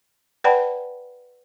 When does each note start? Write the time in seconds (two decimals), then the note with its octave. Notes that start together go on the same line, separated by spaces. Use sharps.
0.44 B4 D5 F#5 G5 A5 B5